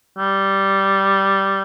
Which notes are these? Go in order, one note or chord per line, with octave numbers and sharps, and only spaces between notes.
G3